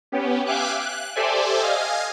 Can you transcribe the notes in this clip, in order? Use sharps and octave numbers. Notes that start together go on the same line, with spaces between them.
B3 C#4 G4
E5 F5 G5 G#5 D6 F#6
F#6
G4 A4 C5 D5 E5 G#5
D#5 F5 G#5